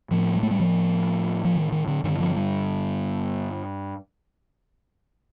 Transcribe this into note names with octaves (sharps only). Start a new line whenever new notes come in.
A2 F3
G3
A3
G3
F3
F3
D#3
D#3
D3
G2 D3 D#3
F3
G3